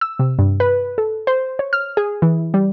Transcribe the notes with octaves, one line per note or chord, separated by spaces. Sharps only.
E6
C3
G2
B4
A4
C5
C#5
F6
G#4
E3
G3